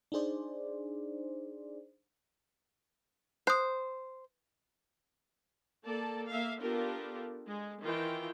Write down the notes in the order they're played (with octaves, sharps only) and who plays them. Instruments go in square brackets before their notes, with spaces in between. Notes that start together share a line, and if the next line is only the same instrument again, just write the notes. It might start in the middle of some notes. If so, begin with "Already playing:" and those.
[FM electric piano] D4 D#4 G#4 C5 D5
[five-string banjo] C5 [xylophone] D#6 F#6
[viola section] A#3 A4 D5 A5
A#3 E5 F5
B3 D4 F4 G4 A4 A#4
G#3
D#3 E3 F4 G5